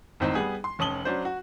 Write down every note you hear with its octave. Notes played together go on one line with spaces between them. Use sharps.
G#1 A2 C4 D#4 C5
G3 B3 G#4
C6
F1 C#4 A5 D#6 F#7 G7
F#3 C#4 D4 C5
F#4